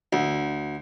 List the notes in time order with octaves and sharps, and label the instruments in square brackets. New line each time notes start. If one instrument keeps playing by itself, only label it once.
[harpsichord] D2